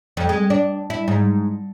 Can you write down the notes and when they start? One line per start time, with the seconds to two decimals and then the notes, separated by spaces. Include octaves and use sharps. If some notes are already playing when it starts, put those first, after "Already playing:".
0.17 F2
0.29 G#3
0.50 D4
0.90 E4
1.08 G#2